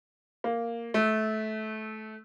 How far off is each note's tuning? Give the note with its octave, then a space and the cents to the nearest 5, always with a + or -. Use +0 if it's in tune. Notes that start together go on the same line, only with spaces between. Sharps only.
A#3 -5
A3 -20